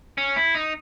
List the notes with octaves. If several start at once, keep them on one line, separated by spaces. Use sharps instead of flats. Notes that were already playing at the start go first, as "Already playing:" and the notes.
C#4
E4
D#4